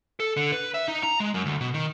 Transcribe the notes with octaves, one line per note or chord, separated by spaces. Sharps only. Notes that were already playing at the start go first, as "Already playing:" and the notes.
A4
D3
B4
E5
D#4
A#5
G#3
F#2
D2
B2
D#3